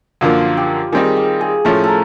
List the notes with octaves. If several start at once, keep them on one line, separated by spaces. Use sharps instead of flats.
F#2 D3 F3 A#3 F4
G4
D#3 G3 C4 D#4 G#4
G4
G#4
A2 F3 A3 C#4 A4
A4 A#4